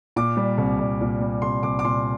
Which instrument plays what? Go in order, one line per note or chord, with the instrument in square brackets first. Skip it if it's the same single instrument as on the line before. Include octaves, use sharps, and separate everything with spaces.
[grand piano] A#2 D6
G3
C2
C2
A#2
G3
C2 C6
C2 D6
D6
A#2 C6